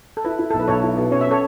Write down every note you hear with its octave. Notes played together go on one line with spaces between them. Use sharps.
A4
E4 B4
E4
B1 A4
B4
B1 A4 C#5
E4
B2
C#4 C#5
E5
C#4 A4 C#5